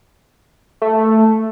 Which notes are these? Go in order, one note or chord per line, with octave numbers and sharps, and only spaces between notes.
A3